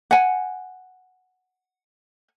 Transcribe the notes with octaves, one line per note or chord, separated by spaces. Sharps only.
F#5 G#5